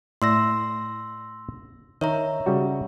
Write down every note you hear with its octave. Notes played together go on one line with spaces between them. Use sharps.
A2 A3 D5 C6 E6 A#6
D#3 C#5 E5 A#5
C#3 G3 F#4